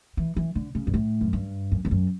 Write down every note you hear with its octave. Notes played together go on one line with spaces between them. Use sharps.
E3
E3
D3
C#3
G2
A2
F#2
G2
F#2
E2
F#2